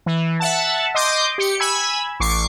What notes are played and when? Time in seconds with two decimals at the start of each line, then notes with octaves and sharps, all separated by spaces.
0.06 E3
0.40 E5 F#5 A5
0.95 D#5 C6 D6 G6
1.38 G4 C#7
1.60 G#5 B5 E6 G#6
2.20 A1 C#6 D6 C7